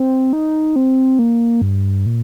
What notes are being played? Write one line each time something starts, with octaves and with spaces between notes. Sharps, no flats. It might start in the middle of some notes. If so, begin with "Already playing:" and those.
Already playing: C4
D#4
C4
A#3
G2
A#2